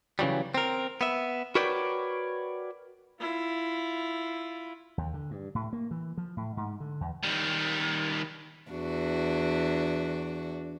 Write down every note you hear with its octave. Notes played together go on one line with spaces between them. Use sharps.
C#3 E3 F#3 G3
C4 A#4
B3 E5
F#4 A#4 B4 C#5 D5 G5
E4 F4
D#2
D3
G2
A2
A#3
E3
F3
A2
G#2
D3
E2
D#3 G3
E2 D4 F#4